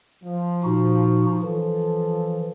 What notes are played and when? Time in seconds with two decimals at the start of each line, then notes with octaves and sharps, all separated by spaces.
0.24 F3
0.64 A#2 D#4 F#4
1.43 E3 F3 A4